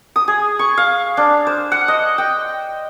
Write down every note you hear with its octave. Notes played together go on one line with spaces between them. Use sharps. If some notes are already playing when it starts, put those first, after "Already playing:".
D#6
G#4
C#6
F5
D4
C5
F#5
D#5
G5